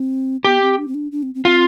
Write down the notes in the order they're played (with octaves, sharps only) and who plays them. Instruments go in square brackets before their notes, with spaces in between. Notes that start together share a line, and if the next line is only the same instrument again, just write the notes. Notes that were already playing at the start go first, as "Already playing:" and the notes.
Already playing: [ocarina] C4
[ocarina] B3 [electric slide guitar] G4
[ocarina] C4
D4
C4
D4
D4
C4
C4
[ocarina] C4 [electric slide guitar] F4